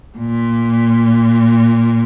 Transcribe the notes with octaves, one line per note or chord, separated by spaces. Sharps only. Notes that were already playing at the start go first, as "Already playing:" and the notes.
A#2